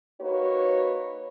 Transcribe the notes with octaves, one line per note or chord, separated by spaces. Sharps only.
A#3 D#4 F#4 B4 C#5